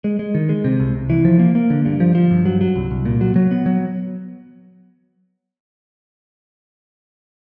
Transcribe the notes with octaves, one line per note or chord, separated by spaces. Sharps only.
G#3
G#3
D#3
G#3
C3
C2
C2
E3
F3
A#3
A#3
D3
G2
F3
F3
G2
F#3
F#3
C2
C2
A#2
F#3
F#3
B3
F#3